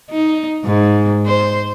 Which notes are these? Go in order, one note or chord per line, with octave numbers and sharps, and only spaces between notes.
D#4
G#2
C5